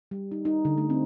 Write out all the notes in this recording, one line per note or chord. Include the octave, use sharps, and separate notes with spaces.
G3
D#4
D#4
D3
A3
C4